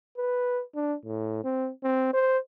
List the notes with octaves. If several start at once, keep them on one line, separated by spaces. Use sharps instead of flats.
B4
D4
A2
C4
C4
C5